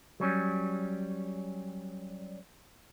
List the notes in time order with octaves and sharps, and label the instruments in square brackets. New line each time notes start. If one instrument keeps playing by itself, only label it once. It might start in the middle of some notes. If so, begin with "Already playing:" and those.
[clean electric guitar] F#3 G3 C#4